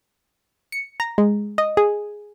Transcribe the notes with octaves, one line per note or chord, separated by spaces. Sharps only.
C#7
A#5
G#3
D#5
G#4